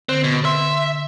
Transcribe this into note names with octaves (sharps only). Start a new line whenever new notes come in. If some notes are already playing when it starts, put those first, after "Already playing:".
D3 C4
B2
E5 C6